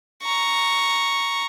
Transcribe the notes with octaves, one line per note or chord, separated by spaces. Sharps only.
A#5 C#6